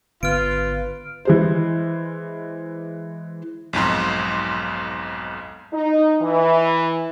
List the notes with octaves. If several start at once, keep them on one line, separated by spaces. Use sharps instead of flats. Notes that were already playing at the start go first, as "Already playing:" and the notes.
G#1 D3 B3 F4 B4 F6 D7
E3 G#3 C5
B1 F2 G#2 C6
D#4
E3